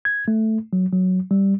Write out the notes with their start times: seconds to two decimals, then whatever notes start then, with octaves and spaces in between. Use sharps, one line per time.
0.05 G#6
0.28 A3
0.73 F#3
0.93 F#3
1.31 G3